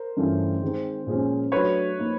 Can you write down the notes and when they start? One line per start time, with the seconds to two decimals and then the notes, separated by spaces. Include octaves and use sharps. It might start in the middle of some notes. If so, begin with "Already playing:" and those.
Already playing: A#4 C5
0.17 G2 E3 A3 C#4 F4
0.62 D#3 G#3 C4
1.07 A#2 F3 G#3 C#4
1.52 F#3 A3 D4 F#4 B4 C#5
1.97 F3 A#3 D#4